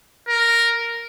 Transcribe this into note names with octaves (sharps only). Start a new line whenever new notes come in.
A#4